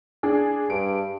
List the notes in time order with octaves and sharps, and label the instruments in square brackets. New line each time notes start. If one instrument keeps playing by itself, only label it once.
[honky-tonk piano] D4 G#4
[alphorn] G2 [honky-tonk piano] D7